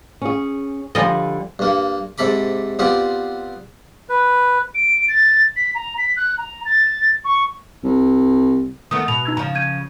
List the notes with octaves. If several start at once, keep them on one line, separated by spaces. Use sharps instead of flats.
C#4 G#4
D3 F3 G3 D#5 G#5
G2 A#3
G#2 C3 A4 B5 D6
G3 B3 C4 F4 G4
B4
D7
A6
B6
A#5
B6
F#6
A#5
A6
C#6
C2
D#3 A3 B3 D#6
B2 F7
D#4 E6 G#6
C#3 F3 A#5
G6 G#6 D#7